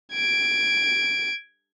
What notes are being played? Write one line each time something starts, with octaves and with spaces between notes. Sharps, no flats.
G#6 D7